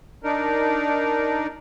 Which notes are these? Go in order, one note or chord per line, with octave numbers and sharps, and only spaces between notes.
D4 D#4 A#4